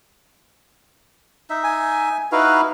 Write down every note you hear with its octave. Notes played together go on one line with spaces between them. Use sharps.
D#4 E5
G#5
D#4 E4 F#4 B4 F5